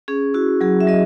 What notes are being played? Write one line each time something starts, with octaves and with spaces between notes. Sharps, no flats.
C#4 G#4
E4 F#4
F#3 G#4
E5
F#3 D#5